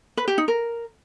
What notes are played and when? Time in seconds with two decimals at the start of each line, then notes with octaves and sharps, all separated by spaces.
0.17 B4
0.28 G4
0.38 D#4
0.48 A#4